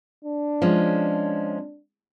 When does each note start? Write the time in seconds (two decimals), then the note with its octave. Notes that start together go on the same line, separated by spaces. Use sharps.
0.25 D4
0.62 F3 G#3 C#4